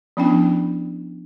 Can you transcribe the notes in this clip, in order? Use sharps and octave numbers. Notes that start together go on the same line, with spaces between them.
F3 B3 C#4 D4 E4 G5